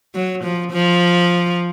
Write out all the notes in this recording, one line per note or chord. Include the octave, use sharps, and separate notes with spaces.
F#3
F3
F3